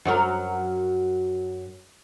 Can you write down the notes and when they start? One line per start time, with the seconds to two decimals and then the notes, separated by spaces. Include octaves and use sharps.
0.05 F#2 F#3 A#4